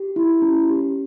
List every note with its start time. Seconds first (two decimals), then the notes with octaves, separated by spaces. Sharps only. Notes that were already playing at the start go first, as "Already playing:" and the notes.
Already playing: G4
0.16 E4
0.42 C#4
0.69 G4